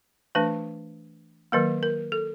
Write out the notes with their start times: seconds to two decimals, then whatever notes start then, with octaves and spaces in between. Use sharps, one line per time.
0.35 E3 A3 D4 B4
1.52 D#3 F#3 A#3 A#4
1.83 A#4
2.12 A4